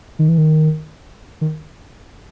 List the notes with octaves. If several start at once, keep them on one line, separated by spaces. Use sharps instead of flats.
D#3
E3
D#3
D#3